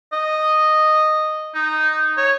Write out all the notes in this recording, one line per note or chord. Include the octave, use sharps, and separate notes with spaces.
D#5
D#4
C#5